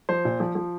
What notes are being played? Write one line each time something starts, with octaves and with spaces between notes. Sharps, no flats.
F3 C5
A#2
F3
F3